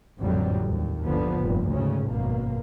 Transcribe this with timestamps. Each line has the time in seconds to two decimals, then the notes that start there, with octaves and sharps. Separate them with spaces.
0.20 A1 F2 G#2 D3 F#3 G3
0.68 D#2
1.04 G1 D3 F3 B3
1.40 F1 G2 A#2
1.73 D2 G#2 C#3 C#4
2.10 G#1 F#2 B2 A#3